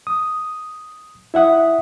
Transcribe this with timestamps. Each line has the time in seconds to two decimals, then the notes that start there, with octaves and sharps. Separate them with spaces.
0.07 D#6
1.34 E4 E5 F#5 D#6